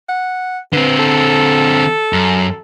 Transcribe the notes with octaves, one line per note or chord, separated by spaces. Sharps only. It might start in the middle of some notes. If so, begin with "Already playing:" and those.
F#5
D3 C4 B4
A4
F#2